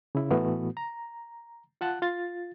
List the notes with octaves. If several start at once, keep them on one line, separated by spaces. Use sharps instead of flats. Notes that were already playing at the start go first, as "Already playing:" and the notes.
C#3 E4
A2 E3 A3 B3 F#4
A#5
F4 F#5 A5 F#6
F4 A6